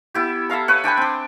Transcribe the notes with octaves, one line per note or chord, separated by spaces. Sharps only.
B3 E4 G4
A4 E5 F5 A#5
B4 C#5 F#5
D4 G5 G#5 B5
C4 D4